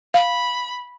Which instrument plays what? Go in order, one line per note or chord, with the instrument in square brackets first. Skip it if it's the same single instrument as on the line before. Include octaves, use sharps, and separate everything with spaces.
[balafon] F5 [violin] B5